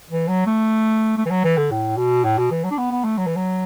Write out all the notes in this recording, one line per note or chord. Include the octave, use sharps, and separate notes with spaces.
E3
F#3
A3
A3
E3
F#3
E3
D3
A2
B2
A2
B2
E3
F#3
D4
B3
B3
A3
F#3
E3
F#3